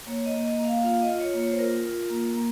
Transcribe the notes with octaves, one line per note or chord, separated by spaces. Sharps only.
A#3 C#5
D#5
A#3
D#5
A#3
F5
F4 F5
D#5
F4
C#5
A#3
C#5
C5
F4 A#4
F4
A#3
A#3